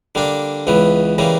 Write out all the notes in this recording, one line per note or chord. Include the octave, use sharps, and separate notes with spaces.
D3 G3 A#3 D4
C#2 C#3 E3 B3
C#3 E3 G3 A#3